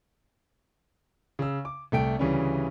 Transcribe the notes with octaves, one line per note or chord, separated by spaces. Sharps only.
C#3 E6
D6
C2 A3 G5 D7
D2 C#3 E3 G3 C#4